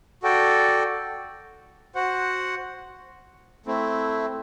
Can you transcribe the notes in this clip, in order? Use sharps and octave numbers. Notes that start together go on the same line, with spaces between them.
F#4 A4 D5 G5
F#4 C5 F#5
A3 C4 E4